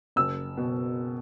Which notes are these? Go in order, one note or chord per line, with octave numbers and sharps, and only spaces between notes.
F#1 E6
B2